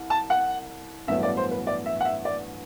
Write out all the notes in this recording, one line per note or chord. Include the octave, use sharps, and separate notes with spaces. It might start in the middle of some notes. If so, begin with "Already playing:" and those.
Already playing: C2
A5
F#5
A1 G2 F#3 B3 E5
D5
C5
B4
D5
E5
F#5
E5
D5